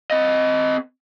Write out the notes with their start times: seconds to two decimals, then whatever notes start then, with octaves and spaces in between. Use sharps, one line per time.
0.11 C4 D#5